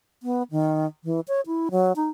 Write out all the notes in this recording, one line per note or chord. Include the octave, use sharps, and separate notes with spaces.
B3
D#3
E3
C#5
E4
F#3
D#4